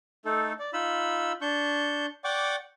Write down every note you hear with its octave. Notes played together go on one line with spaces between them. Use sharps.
A3 D#4 A4
D5
D#4 F4 B5 E6
D4 C#6 G6
D5 F#5 G5 C#6 D6